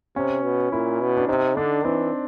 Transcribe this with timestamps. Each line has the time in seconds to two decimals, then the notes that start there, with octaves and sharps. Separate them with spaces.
0.16 C3 C#4
0.43 B2
0.72 A#2 E4
1.01 B2
1.17 D4
1.28 C3 D#4
1.57 D3 D4
1.85 E3 C4